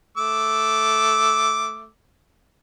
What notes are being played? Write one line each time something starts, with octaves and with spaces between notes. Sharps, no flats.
A3 D6 E6